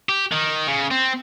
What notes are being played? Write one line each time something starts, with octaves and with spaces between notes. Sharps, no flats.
G4
D#3
C#3
C4